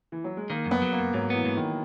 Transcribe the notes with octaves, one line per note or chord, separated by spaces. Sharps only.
E3
F#3
G#3
D#3 A#3
F#2
B3
F#3
A#3
F#2
G#2 F#3
E3 B3
G#2
D#3